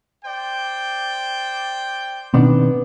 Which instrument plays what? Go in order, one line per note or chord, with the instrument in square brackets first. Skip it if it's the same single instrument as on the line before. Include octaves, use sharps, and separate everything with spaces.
[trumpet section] C5 D5 G5
[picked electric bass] B2 D#3 C4 [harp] B3 D4